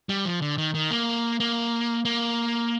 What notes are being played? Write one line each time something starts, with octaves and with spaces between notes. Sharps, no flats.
G3
F3
D3
D#3
D#3
A#3
A#3
A#3